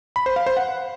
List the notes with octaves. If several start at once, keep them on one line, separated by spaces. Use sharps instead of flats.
B5
C5
F5
C5
F#5